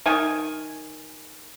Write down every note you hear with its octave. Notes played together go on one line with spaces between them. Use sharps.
D#3 G#5